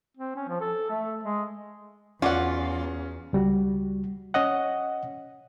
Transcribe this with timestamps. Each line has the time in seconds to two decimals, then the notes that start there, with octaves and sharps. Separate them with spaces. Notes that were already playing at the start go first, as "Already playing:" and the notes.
0.17 C4
0.36 C#4
0.48 F3
0.61 A4
0.90 A3
1.23 G#3
2.22 E2 C#4 F4 F#4 D5 F#5
3.33 C#2 G3 F#4
4.34 C#4 C#5 D#5 F#5